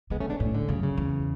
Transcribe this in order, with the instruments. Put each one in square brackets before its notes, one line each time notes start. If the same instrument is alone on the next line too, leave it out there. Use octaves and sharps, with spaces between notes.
[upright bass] C#3 [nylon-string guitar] G#3 B3
[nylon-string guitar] A3 C#4
B3 D4
[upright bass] A2 [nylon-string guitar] A3 C#4
[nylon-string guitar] D3
[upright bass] F#2 [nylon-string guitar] C#3
[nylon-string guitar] C#3
[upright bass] E2